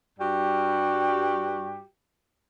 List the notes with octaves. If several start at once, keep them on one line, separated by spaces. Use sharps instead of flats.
G2 G3 F#4 G4